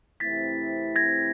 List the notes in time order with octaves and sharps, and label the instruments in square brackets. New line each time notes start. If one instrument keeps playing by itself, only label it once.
[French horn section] C3 E3 A3 C4 E4 [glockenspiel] A6 B6
[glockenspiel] G#6 A#6